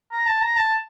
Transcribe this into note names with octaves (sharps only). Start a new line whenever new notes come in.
A#5
A5
A#5
A5